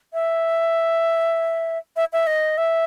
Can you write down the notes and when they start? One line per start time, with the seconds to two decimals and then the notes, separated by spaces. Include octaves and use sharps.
0.13 E5
1.96 E5
2.13 E5
2.27 D#5
2.58 E5